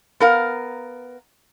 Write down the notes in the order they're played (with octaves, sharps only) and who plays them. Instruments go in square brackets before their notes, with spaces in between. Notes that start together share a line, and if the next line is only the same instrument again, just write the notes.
[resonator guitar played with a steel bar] B3 A#4 F5